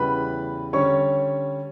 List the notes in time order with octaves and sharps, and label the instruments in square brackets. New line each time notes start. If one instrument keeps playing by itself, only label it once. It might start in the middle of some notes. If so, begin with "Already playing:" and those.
Already playing: [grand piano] E2 C#3 E3 G3 B4 B5
D3 G3 C#4 C#5 C#6